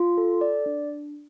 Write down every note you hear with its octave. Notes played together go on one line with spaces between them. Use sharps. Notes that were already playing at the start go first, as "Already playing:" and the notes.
Already playing: F4
A4
D5
D4